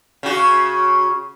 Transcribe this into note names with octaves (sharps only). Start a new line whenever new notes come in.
C#3 F#4